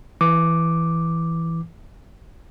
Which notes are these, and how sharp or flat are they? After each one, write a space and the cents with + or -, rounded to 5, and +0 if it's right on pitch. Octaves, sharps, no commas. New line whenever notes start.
E3 +0 D6 +0